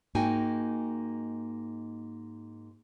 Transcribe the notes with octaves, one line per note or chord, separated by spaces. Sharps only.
G#2 A#3 D#4 F#4 G5 G#5